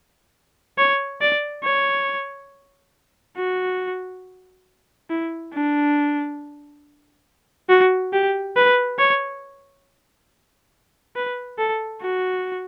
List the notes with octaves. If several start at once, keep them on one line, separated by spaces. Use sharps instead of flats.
C#5
D5
C#5
F#4
E4
D4
F#4
G4
B4
C#5
B4
A4
F#4